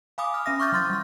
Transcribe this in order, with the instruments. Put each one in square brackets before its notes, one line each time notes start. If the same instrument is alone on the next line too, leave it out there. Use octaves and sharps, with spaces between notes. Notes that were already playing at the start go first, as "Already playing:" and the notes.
[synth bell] F5 G#5 B5 D6 D#6
F6
C#4 E5 A#6
C#6 D6 F6 G6 A6
F#3 C6 A6
G3 F6